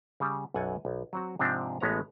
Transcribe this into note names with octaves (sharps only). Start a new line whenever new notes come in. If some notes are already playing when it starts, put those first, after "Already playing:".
C#3 G3
B1 F#2 A4 F#5 G#5
B1
F#3 C4 F#4
G#2 C3 F3 C4 D4
A1 A2 G#3 B3 C#4 A#5